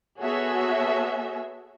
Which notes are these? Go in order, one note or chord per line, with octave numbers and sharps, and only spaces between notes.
B3 F#4 G#4 A4 C#5 E5